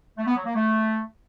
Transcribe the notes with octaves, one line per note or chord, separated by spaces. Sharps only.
A3
B3
F#3
A#3
A3